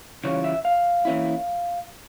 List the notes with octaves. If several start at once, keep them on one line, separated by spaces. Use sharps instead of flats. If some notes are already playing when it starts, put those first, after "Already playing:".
C#3 E3 G3 C#4 F4 C#5
E5
F5
E3 A#3 C#4 E4